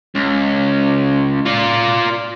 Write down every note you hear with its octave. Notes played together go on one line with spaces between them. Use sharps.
C#2
F4 D5